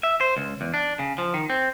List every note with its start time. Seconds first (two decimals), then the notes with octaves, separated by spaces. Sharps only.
0.03 E5
0.21 C5
0.37 C#2
0.61 E2
0.74 D4
0.99 C#3
1.18 F3
1.34 D#3
1.50 C4